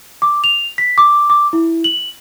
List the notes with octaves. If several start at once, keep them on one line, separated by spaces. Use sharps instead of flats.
D6
F7
B6
D6
D6
E4
F#7